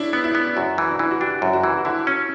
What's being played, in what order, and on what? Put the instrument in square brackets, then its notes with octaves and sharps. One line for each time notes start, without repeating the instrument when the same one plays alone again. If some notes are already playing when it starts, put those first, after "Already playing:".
Already playing: [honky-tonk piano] C#4 D4 E4
[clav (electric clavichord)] B3
[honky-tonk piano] E4
[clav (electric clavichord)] B3
[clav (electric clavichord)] F#2 [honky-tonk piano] F#4
[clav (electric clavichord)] E3
[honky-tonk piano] D4
[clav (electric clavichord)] E3 [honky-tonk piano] E4
[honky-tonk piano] F#4
[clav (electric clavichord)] D4 [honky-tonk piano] G4
[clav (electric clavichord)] F#2
[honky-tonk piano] F#4
[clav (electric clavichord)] E3
[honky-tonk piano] F#4
[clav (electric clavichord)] D3 [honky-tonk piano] E4
[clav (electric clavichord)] C#4